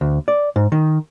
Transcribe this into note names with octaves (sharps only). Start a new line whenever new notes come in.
D2
D5
G#2
D#3